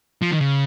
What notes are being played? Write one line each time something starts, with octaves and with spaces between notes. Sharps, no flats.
F3
D#3
C#3